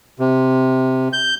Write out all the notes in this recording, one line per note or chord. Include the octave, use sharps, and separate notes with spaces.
C3
G6